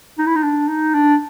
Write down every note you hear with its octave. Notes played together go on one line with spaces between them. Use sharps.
D#4
E4
D#4
D4
D#4
D4